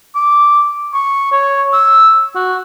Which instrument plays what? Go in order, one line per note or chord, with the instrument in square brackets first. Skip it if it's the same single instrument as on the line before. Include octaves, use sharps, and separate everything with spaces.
[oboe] D6
C#6
C#5
E6
F#4